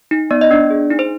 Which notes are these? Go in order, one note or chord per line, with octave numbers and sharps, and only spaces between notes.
D#4
B3 D5
D#5
B3 D4 D5
G#4
D#4
C5